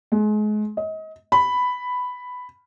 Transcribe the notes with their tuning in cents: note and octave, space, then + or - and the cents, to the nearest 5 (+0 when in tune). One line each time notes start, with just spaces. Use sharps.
G#3 +35
D#5 +30
B5 +5